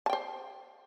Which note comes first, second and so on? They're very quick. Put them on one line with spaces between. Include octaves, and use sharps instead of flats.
A5 G5 C5